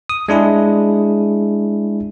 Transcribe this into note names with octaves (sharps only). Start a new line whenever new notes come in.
D#6
G#3 D4 E4 G#4